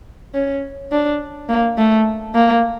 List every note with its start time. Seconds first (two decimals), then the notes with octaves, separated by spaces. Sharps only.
0.34 C#4
0.91 D4
1.49 A#3
1.78 A3
2.35 A#3